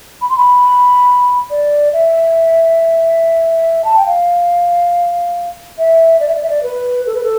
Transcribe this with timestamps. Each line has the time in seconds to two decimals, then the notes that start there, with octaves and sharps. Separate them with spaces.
0.21 B5
0.30 C6
0.37 B5
1.51 D5
1.93 E5
3.85 A5
3.96 G5
4.06 F5
5.78 E5
6.20 D5
6.29 E5
6.35 D5
6.43 E5
6.49 D5
6.63 B4
7.06 A4
7.15 B4
7.23 A4